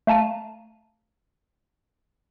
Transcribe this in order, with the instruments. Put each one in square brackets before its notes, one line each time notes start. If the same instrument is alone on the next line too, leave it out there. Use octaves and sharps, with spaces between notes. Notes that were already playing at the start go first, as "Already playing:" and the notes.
[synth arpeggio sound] A3 F5 A5 A#5 D#7